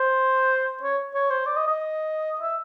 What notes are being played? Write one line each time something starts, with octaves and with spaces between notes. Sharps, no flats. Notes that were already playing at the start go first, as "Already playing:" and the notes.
Already playing: C5
C#5
C#5
C5
D5
D#5
D#5
E5